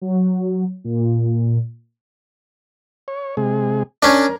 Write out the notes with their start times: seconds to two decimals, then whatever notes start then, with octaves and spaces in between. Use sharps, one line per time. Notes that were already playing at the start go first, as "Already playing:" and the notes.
0.01 F#3
0.84 A#2
3.08 C#5
3.37 C3 G#3 G#4
4.03 C#4 D4 A#4